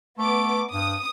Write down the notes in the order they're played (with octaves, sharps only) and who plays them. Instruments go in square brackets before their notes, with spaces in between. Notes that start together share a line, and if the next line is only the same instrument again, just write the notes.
[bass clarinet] A3 [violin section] B3 D6
[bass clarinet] G2 [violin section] D#6